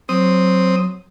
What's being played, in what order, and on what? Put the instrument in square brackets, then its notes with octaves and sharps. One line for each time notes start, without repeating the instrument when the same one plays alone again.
[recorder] F#3 [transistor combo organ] C4 D#6